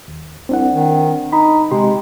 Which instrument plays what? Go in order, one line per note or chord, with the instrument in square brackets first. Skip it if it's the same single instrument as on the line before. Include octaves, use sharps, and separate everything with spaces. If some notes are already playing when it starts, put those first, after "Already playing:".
[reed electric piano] D#2
[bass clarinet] C2 [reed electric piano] C4 D4 F#5
[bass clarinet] D#3
[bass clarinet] D#4 [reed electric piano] B5
[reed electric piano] C3 G4 C6 [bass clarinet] G#3